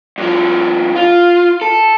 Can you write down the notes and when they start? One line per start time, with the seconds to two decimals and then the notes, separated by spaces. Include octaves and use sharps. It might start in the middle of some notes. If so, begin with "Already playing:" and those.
0.18 G2 F3
0.96 F4
1.61 A4